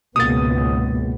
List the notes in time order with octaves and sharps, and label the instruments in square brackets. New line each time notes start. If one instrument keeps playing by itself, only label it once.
[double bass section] G#1 C#2 B3 [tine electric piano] B2 A#3 [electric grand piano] D#6 A6